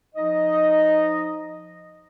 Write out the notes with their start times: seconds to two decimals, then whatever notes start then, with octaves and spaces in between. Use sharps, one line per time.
0.15 F3 D#4 D#5